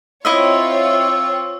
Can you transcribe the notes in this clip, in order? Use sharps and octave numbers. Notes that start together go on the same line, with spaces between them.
C4 E4 F4 C#5 D#5 E5 E6